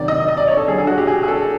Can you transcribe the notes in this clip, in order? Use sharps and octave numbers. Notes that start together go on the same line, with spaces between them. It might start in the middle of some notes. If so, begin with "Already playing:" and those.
Already playing: C3 D#3 F#3 D5
D#5
D#5
D5
C#5
A4
D3 F#3 G#4
G#4
F#4
G4
G#4
G#4
A4